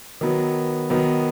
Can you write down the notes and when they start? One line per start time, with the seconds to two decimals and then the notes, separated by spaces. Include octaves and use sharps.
0.21 D#3 F#3 B3
0.90 D#3 F#3 B3